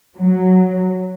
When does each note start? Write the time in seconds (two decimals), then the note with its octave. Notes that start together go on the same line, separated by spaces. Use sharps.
0.16 F#3